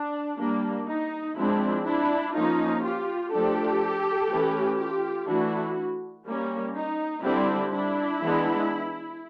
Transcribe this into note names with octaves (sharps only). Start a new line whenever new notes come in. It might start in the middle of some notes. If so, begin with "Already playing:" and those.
Already playing: D4
G3 A#3 D4
D#4
F3 G#3 C4 D4 E4
D4 E4
F3 A#3 C#4 D#4 F4
F4 G4
F3 A3 D4 G4 A4
E3 A3 C#4
F4 G4
E3 A3 D4 E4 F#4
G3 A#3 C#4
D#4
D3 G3 C4 D4 E4
D4 E4
E3 G#3 B3 D4